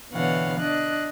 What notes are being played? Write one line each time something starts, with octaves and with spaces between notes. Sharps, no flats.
B2 D3 E3 C#5 F5 F#5
D4 D#5 F#6